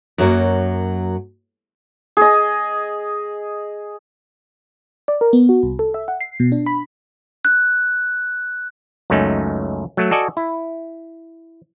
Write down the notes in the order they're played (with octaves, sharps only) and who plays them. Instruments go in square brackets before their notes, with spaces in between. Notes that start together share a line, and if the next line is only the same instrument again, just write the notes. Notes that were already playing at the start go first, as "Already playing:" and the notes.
[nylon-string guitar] F#2 F#3 A#3
[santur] G#4 D#5
[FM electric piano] D5
A#4
B3
F#4
C2
A4
E5
F#5
C7
B2
D4
B5
[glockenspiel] F#6
[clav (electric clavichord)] C#2 F#2 A3 C#4 D#4
F#3 A3
F#4 A4 D5 D#5 G#5
E4